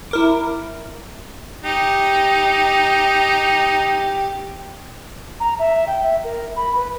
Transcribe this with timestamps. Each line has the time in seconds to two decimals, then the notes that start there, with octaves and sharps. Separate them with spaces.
0.11 E4 A#4 D6
1.64 D#4 G4
5.40 A#5
5.59 E5
5.87 G5
6.03 E5
6.24 A#4
6.56 B5
6.76 B4